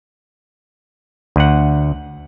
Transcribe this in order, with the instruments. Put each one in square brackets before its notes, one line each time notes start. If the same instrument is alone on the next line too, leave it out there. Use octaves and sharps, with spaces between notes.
[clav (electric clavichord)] D2 F#5